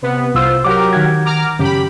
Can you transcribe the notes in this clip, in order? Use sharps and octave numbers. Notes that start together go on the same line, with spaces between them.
C3 B3
C2 F4 C5 E6
F#3 G4 A#4 F#5 D6
D#3 F#5 G#6
A#5 D6 F6
F#2 C#3 G4 B5